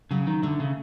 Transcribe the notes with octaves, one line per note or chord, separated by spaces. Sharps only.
C#3 F#3
D#3
D3 A3
C#3